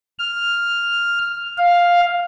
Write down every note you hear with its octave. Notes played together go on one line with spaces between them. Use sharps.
F6
F5